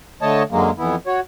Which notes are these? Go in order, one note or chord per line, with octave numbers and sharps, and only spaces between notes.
D3 A3 C#5 D#5 A5
F#2 D3 F#3 G#3 A#3
F2 E3 B3 E4
F#4 C#5